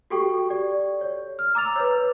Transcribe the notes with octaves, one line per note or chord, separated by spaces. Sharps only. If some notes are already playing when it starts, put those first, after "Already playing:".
F#4 G4 A4 G5 C#6
D5
C#5
F6
A#5 D6 E6 A6 F7
B4 C#5